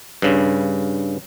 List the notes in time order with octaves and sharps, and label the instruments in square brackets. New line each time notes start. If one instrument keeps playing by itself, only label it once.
[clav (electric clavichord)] G2 C#3